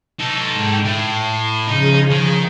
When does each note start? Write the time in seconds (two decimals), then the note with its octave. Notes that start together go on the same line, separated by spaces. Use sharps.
0.19 D#4 A4 A5
0.52 G#2 G5
0.84 A2 C7
1.67 C#3 F3 D#4 G#4
2.11 D#3